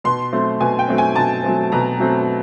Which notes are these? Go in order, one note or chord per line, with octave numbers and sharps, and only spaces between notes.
B2 C6
F#3 A3 C4
B2 G#5
G5
F#3 A3 C4
G#5
B2 A5
F#3 A3 C4
B2 A#5
F#3 A3 C4